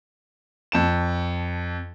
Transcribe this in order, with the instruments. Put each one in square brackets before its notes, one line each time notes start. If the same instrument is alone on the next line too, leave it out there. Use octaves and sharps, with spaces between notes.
[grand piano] F2 A5 E7